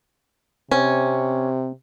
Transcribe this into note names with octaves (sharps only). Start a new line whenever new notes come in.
C3 C4 C#4